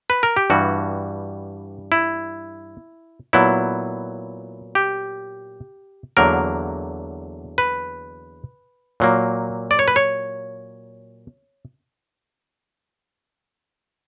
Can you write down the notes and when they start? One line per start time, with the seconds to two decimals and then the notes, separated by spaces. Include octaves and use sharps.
0.10 B4
0.23 A#4
0.37 G4
0.50 G2 E3 G3 F#4
1.92 E4
3.33 A#2 F#3 B3 E4
4.75 G4
6.17 E2 D3 F#3 A#3 A#4
7.58 B4
9.00 A#2 F#3 A#3
9.71 D5
9.79 C#5
9.88 B4
9.96 C#5